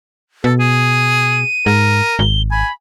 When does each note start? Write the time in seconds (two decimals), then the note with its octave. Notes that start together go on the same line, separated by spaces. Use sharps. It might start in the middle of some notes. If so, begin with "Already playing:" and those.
0.44 B2 A4
0.60 G#4 D#7
1.66 G#2 A#4
2.19 G#1 G7
2.51 G#5 B5